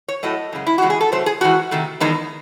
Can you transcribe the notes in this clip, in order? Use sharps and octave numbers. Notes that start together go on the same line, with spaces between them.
C#5
A2 F#3 A3 D#5
F#2 C#3 G#3
E4
E2 C#3 G#3 F#4
G#4
A4
C3 F#3 A3 C5
G#4
G#2 E3 A3 F#4
C3 D#3 A3
E2 D#3 G#3 D#4